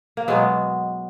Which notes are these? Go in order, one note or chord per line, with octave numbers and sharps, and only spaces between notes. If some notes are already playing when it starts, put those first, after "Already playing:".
A#3
B2 F#3 G#3 B3